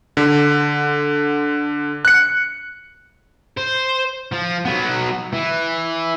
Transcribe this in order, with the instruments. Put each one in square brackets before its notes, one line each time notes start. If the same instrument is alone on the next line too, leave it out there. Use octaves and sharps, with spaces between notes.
[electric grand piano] D3
F#6 C#7
[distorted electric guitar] C5
F3
F#3 B3
E3